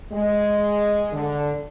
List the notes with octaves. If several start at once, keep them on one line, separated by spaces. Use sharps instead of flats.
G#3
D3